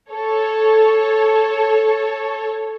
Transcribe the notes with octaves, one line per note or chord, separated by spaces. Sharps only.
A4 C#5